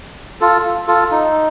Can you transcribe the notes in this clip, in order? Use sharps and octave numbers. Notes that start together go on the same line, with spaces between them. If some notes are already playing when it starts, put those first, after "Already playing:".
F4 A4
F4 A4
D#4